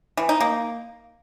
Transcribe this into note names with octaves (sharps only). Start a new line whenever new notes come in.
E3
D#4
A#3